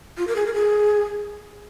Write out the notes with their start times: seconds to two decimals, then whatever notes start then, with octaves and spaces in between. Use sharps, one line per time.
0.18 F4
0.27 A#4
0.36 G#4
0.46 A#4
0.54 G#4